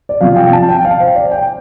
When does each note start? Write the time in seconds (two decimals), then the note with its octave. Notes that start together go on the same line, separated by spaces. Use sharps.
0.09 D5
0.21 C3 F3 F5
0.36 G5
0.53 A5
0.69 G5
0.85 F5
1.00 C5
1.15 D5
1.31 G5